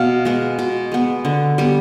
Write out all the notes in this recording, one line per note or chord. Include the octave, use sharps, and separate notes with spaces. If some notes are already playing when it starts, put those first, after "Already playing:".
Already playing: B2 F5
G#3 B3
B2
G#3 B3
D3
G3 B3